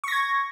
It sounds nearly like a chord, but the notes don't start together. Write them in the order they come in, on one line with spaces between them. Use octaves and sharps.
C#6 A#6 G#6